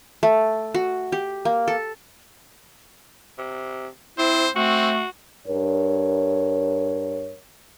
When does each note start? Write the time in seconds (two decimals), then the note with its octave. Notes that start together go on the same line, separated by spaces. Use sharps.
0.23 A3
0.74 F#4
1.12 G4
1.45 A#3
1.68 A4
3.38 C3
4.18 C4 E4 C5
4.56 A3 C4 F#4
5.48 G2 A#4 C#5